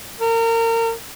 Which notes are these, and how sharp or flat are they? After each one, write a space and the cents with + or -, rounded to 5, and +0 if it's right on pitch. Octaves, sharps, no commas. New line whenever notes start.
A#4 -30